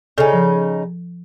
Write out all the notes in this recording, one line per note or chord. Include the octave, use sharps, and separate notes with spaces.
C#3 D#4 A4 G#5
F3